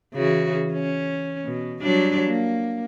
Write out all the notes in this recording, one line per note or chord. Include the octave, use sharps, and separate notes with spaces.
C#3 E3 F#4
C#4
B2
F#3 G3 D4
A#3